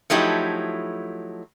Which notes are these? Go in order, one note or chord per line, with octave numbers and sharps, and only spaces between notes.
F3 F#3 A3 D#4 E4 G4